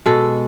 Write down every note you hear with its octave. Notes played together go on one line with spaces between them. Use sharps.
B2 G#3 A4